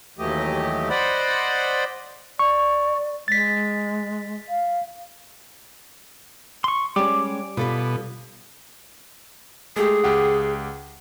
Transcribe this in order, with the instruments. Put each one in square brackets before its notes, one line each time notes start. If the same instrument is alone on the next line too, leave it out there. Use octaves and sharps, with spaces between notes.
[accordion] D#2 E3 F#3 A3 G4 D#5
C5 D5 D#5 F#5 B5
[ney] D5 [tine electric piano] C#6
[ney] G#3 [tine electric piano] A6 B6
[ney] F5
[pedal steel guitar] C6 C#6
[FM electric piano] G3 [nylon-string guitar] G#3 C#4 [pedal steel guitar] D6
[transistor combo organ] B2 [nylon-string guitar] F4 A4 B4
[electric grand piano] G#3 A3 G4 [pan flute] G#4
[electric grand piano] C#2 G4 F#5